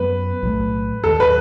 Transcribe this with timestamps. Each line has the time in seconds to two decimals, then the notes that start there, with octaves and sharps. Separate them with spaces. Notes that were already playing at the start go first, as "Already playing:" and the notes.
Already playing: F#2 F#3 B3 B4
0.43 B1 A2 F#3 A3
1.04 D#2 D#3 F#3 A4
1.20 B4